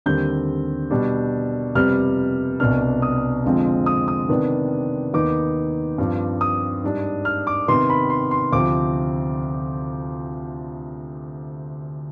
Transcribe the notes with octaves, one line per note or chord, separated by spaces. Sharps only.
D#2 D3 G3 C4 G6
B2 G3 D4
F2 C3 G3 B3 F6
C2 B2 B3 D4 F6
D#6
F2 D3 F3 G#3 C4
D#6
D#6
C3 D#3 B3 D4
D#2 D#3 B3 D#4 D6
G2 F3 C4
D#6
G#2 G3 D4
F6
D6
C3 D#3 B3 D#4 C6
B5
C6
C6
D2 C3 F3 C4 D6